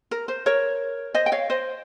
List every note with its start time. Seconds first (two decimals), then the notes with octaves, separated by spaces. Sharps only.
0.11 A#4
0.28 C5
0.46 A#4 C#5
1.14 C5 D#5
1.26 G5
1.32 C#5 F5
1.50 C5 D#5